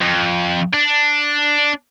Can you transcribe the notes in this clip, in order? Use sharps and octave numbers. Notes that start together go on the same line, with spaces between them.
F2
D4